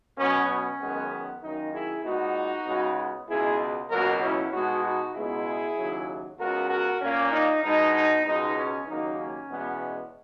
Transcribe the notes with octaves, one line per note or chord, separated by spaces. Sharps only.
B2 F#3 B3 C#4
C#4
F#2 D#3 G#3 B3
F#2 D#3 A#3 D#4
E4 G#4
A#2 G#3 B3 D#4 F#4
C#2 C#3 G#3 B3
C#2 B2 G#3 B3 E4 G#4
C#2 B2 F#3 A#3 F#4 A#4
C#4 E4
B2 G#3 B3 D#4 F#4
D#4 F#4
C#2 B2 G#3 B3 E4 G#4
D#2 C#3 F#3
C#2 C#3 G#3 B3 F#4 A#4
F#4 A#4
A#2 A#3 C#4
D#4
B2 G#3 B3 D#4
D#4
C#2 B2 G#3 D#4
C#4
D#2 C#3 F#3 A#3 D#4
C#4
E2 B2 G#3 B3